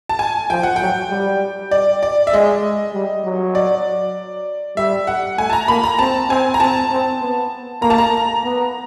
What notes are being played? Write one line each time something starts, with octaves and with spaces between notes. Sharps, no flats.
A5
G#5
F3 G5
F#5
F#3 G5
G3
D5
D5
E5
G#3 D#5
G3
F#3
D5
G3 E5
F#5
A3 G#5
A5
A#5
A#3 B5
A#5
C4 A5
C4 G#5
A#5
C4 A5
C4
B3
A#3 A#5
A5
A#5
B3